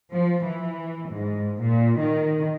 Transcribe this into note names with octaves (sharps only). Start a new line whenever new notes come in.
F3
E3
G#2
A#2
D#3